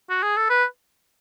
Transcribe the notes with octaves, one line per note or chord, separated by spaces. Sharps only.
F#4
G#4
A4
B4